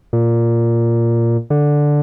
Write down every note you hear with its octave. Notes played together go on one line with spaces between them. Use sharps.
A#2
D3